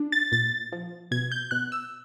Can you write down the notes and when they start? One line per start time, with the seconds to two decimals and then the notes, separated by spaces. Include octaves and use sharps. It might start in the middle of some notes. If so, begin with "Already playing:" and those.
Already playing: D4
0.12 A6
0.32 A#2 A6
0.72 F3
1.11 B2 G#6
1.32 G6
1.51 B2 F#6
1.72 E6